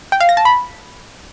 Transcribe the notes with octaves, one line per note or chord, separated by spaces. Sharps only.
G5
F5
A#6
A5
B5